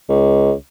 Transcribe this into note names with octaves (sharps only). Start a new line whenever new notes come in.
C#2